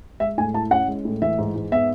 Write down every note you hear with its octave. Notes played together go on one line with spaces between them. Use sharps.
G#3 E5
A2 G#5
E4 A5
C#4 F#5
G#3
A2
E3 E5
G#2
G#2
B3 E5